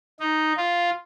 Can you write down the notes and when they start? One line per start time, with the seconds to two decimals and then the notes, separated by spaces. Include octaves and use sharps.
0.20 D#4
0.57 F4